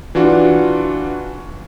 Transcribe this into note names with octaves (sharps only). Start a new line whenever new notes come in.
E3 D4 F4 F#4